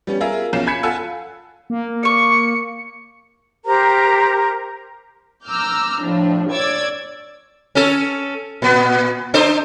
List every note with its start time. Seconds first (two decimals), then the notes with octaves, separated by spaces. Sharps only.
0.07 G3 B3 C#4
0.20 F4 G#4 A#4 E5
0.53 B1 C#4 F4 C7 E7
0.67 G#5 B5 G#6 B6 C#7
0.83 F4 A4 F#5 G#5 E6
1.70 A#3
2.03 D5 C#6 C#7
3.65 G4 A#4 C5 A#5
5.45 A#5 D6 E6 F6 G6
6.02 A2 F3 D4
6.51 C#5 D5 D6 E6 G#6
7.75 C#4 A4
8.62 A#2 B3
9.34 D4 A4 C5